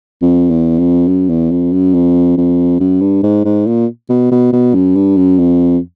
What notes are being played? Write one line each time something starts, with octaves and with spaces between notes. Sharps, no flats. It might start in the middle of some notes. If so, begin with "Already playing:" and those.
F2
E2
F2
F#2
E2
F2
F#2
F2
F2
F#2
G2
G#2
G#2
A#2
B2
B2
B2
F#2
G2
F#2
F2